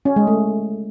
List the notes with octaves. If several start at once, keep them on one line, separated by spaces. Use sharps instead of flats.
C#4
G#3
A3